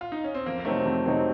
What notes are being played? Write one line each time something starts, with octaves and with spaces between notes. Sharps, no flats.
F4
D#4
C#4
C4
F2 A#3
C3 F#3 A3 C4 D#4
F2
C3 F#3 C4 D#4